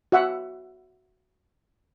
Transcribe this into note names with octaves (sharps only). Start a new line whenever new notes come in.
F#4 E5 F#5